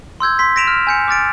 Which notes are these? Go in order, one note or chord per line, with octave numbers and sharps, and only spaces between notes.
C6 E6 G6 G#6
C6 B6
A#6 B6 D7 E7 F7
F6
G#5 G6 C#7
D6 F6 A6 D7